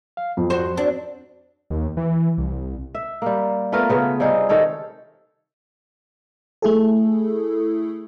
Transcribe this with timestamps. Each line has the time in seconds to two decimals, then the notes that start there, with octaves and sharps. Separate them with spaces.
0.17 F5
0.37 F2 F#3
0.50 F#4 C5
0.77 C4 D4 F#4 C5
1.70 D#2
1.97 E3
2.38 C2
2.95 E5
3.22 G3 A#3
3.72 A3 B3 F4 A#4
3.89 C#3 B3
4.20 C3 G3 D#4 G#4
4.49 C3 D#3 A4 C#5
6.62 A3 E4 G#4 A4